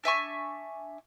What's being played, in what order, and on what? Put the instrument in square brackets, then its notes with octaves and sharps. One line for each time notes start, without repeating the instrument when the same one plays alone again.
[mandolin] D4 E5 G#5 C#6